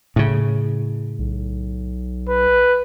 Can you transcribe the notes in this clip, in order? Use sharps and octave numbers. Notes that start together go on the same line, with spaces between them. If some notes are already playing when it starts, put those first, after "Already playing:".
A2 C#3
B1
B4